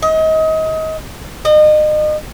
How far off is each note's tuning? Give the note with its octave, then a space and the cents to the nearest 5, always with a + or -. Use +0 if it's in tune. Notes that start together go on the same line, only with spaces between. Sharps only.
D#5 +30
D#5 -35